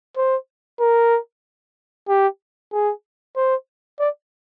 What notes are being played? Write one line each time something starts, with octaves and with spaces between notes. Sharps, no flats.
C5
A#4
G4
G#4
C5
D5